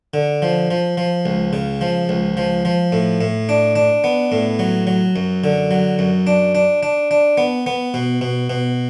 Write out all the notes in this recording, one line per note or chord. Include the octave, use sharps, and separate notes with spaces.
D3
F3
F3
F3
C#2
C#3
F3
C#2
F3
F3
A2
A2
D4
D4
B3
A2
F#3
F#3
F#2
D3
F#3
F#2
D4
D4
D4
D4
B3
B3
B2
B2
B2